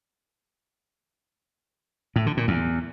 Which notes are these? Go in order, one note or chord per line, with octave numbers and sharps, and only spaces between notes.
A2
D3
A#2
E2